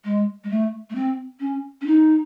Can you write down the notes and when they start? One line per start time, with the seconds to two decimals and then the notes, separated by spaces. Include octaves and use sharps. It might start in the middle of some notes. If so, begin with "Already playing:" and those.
0.04 G#3
0.44 G#3
0.50 A3
0.90 A3
0.95 C4
1.40 C#4
1.81 C#4
1.86 D#4